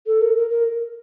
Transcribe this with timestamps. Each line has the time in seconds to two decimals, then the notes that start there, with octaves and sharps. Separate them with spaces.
0.07 A4
0.21 A#4
0.36 A#4
0.50 A#4